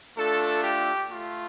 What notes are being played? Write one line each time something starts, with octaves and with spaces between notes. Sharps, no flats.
A3 D4 F4 A4
G4
A3 F4